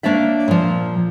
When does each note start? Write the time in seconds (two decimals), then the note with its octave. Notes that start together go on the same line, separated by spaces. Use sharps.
0.03 A#3 D4 C#5 D5 E5
0.48 A#2 F3